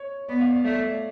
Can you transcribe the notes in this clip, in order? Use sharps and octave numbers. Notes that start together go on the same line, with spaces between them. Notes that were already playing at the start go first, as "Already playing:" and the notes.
Already playing: C#5
B3 D5
F5
D5
A3 D5
D5